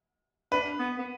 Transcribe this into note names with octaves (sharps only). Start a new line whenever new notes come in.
D4 B4
B3
B3